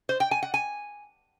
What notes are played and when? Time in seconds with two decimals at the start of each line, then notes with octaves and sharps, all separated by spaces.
0.09 C5
0.20 G5
0.31 G#5
0.43 F#5
0.54 G#5